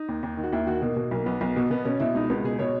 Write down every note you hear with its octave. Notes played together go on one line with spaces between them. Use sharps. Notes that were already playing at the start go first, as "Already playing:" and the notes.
Already playing: D#4
D#2
D#2
D#3
F#4
D#2 E4
D#3 F#4
B2 A#3
B2
B1 A#3
B1 B3
B1
B2
B2 B3
B2 C#4
B2 E4
C#2 D#4
C#2 B3
B2 G#4
B2 C#5